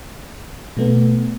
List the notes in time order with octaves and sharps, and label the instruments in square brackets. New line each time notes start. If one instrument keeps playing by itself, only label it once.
[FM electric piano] B2 A3 B3